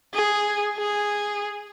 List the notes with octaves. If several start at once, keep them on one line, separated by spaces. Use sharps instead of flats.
G#4
G#4